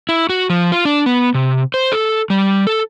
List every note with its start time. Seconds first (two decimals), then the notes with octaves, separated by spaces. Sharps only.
0.09 E4
0.29 F#4
0.50 F3
0.72 F4
0.85 D4
1.06 B3
1.35 C3
1.74 C5
1.92 A4
2.30 G3
2.67 A4